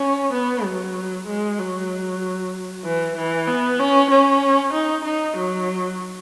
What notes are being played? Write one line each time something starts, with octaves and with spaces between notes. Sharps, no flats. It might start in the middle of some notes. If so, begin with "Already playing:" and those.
Already playing: C#4
B3
F#3
G#3
F#3
E3
E3
B3
C#4
C#4
D#4
D#4
F#3